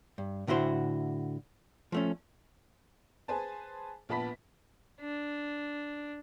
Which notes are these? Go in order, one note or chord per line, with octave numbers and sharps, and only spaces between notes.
G2
A2 D3 E4 F#4 C5
F3 A3 C#4
G#4 B4 C5 G#5 A5
A#1 A#2 B3 A5 B5 B6
D4